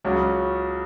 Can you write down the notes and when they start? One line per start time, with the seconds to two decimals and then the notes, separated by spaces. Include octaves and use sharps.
0.04 C#2 C#3 F#3 C#4